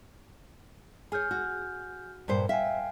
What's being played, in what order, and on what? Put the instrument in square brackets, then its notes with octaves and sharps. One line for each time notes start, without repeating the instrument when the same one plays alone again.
[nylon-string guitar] G#4 C#5 [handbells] G#5 F6 G6
[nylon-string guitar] F#4
G2 A#2 C5
[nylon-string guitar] E5 [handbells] F5 G5 G#5